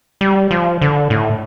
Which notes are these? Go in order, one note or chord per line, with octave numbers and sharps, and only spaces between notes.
G3
F3
D3
A2